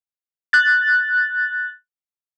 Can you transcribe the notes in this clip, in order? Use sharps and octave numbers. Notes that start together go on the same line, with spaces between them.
F#6 A6